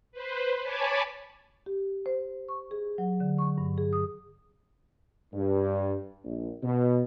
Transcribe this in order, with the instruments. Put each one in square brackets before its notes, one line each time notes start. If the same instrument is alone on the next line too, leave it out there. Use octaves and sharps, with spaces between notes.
[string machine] B4 C5
C#5 G#5 A5 B5 D6
[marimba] G4
C5
C#6
G#4
F#3
D3
C#6
G2
G#4
D#6
[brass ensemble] G2
A#1
B2